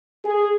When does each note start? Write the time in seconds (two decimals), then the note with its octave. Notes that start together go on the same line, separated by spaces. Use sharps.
0.25 G#4